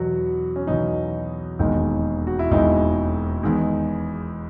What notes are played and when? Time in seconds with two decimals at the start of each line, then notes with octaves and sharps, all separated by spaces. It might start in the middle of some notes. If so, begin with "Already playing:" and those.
Already playing: E2 B2 F#3 F#4
0.56 C#4
0.67 E2 B2 F#3 D#4
1.59 E1 D#2 D#3 G#3
2.27 F#4
2.39 E4
2.51 E1 D#2 D#3 G#3 D#4
3.43 E2 D#3 G#3